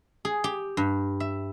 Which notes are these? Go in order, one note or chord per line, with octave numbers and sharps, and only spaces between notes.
G#4
G4
G2
E5